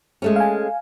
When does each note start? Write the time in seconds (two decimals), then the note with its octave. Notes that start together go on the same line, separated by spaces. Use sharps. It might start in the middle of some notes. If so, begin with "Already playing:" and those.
0.22 G#3 A3 C#4
0.36 F5 G#5